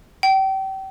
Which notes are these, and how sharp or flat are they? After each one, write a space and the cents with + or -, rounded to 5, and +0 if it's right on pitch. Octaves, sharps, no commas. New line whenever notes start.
G5 -30